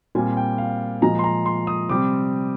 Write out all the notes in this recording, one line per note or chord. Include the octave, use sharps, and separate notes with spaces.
A#2 G3 C4 G#5
G5
F5
A#2 F3 G#3 A#5
C6
A#5
C6
D#6
C3 G3 C4 D6